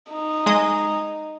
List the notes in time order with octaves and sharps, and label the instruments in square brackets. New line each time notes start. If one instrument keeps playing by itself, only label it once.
[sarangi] D#4
[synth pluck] G#3 D#5